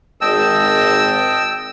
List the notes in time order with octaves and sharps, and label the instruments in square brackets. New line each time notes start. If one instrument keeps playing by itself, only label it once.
[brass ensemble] G#1 [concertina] D#5 G5 A5 [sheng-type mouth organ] E6